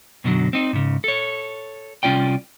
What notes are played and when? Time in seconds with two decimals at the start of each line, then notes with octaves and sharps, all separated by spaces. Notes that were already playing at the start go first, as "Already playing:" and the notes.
0.24 F#2 B2 D3 F3 F#3
0.53 C4 D#4
0.73 G#2 C#3
1.04 A4 C#5
2.03 C2 F2 C#4 F4 D5 G5